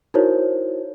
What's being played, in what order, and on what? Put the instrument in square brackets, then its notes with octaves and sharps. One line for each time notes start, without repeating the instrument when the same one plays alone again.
[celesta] D#4 E4 F#4 A#4 C5 C#5